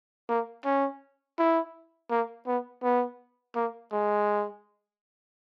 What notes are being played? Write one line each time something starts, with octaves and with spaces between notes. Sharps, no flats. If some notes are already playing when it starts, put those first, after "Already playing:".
A#3
C#4
E4
A#3
B3
B3
A#3
G#3